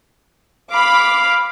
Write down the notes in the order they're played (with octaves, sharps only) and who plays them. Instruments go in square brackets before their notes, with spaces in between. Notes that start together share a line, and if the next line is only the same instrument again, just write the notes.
[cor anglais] F5 [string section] B5 D6